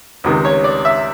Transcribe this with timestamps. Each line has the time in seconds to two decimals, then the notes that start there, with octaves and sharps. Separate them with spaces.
0.24 C#2 C3 D#3
0.45 C#5
0.64 D5
0.85 E5